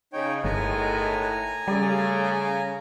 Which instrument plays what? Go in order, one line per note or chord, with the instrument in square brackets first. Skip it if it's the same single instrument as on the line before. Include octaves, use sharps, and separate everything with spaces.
[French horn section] C#3 [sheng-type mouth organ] D#4 C#5 G5
[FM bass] G1 [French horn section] A2 [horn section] D#3 G#3 B3 [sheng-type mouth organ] G#5 A#5
[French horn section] C#3 [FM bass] G3 [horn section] A3 G#4 D5